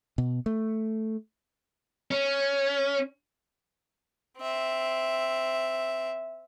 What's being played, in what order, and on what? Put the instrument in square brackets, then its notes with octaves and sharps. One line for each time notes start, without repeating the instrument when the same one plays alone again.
[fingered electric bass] B2
A3
[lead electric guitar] C#4
[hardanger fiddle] C4 E5